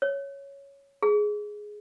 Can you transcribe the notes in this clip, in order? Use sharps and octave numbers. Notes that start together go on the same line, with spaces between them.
C#5
G#4